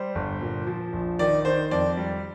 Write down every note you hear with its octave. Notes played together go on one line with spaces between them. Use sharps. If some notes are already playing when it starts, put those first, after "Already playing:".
Already playing: G3 C5
G1
A#2
F3
A#1
D#3 D5
D#3 C5
F2 D5
G3